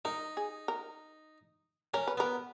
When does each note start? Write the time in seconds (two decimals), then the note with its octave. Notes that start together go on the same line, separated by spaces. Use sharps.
0.05 D#4 A#4
0.37 G#4
0.68 A#4
1.94 C#4 A#4
2.07 B4
2.17 B3 A#4